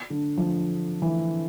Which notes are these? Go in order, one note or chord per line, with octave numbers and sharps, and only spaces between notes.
D3
F3
E3